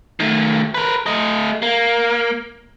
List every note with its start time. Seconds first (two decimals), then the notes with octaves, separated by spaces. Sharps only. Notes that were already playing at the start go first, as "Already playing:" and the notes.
0.20 D#3 A3
0.74 A#4 B4
1.06 A3 D#5
1.62 A#3